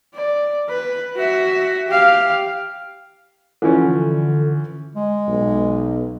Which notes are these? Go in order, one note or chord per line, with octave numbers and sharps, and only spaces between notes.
D5
B4
F#4 E5
G4 F5
D3 E3 F3 C#4
G#3
B1